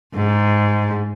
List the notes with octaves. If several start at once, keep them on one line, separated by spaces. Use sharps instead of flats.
G#2